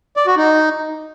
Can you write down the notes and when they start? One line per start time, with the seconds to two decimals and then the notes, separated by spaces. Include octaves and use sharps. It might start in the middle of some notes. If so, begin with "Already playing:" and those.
0.17 D5
0.27 F#4
0.37 D#4